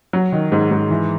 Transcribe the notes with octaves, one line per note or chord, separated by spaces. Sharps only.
F#3
D#3
G#2
G#2
E3